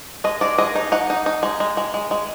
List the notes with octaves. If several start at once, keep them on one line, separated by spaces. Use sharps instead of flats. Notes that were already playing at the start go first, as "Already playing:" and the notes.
G#3 D#5
G#3 D5
G#3 D#5
D#4
D#4 F#5
D#4
D#4
G#3
G#3
G#3
G#3
G#3